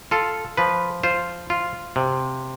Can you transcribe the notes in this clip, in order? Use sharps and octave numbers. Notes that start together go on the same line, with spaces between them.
F4 A4
F3 B4
F4 C5
F4
C3